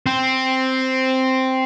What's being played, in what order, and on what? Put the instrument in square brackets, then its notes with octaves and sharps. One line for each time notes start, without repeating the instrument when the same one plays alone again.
[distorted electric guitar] C4